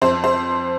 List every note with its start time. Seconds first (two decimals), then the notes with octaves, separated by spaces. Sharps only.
0.02 F2 C5
0.24 C5